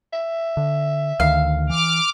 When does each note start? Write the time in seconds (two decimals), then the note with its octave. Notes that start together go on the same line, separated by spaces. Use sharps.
0.13 E5
0.57 D3
1.20 D2 D#3 F5
1.69 E3 D6 F6